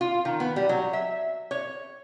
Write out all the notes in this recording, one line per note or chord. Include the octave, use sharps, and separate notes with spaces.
F4
D#3
B3
G3
F#3
E5
C#5